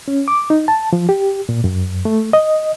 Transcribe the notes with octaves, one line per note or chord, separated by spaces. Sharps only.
C#4
D6
D#4
A5
F3
G4
A#2
F#2
A3
D#5